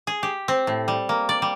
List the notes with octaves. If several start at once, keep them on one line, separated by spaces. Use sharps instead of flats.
G#4
G4
C4
A2
G3
A#3
D5
G3